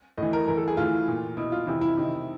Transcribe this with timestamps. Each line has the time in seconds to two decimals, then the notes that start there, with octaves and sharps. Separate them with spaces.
0.18 A2 E3 D#5
0.33 A#4
0.48 A2 E3 A#4
0.57 A4
0.68 G#4
0.77 A2 E3 F4
1.08 A#2
1.37 B2 E4
1.52 F4
1.67 C3 E3 E4
1.81 E4
1.97 C3 D#3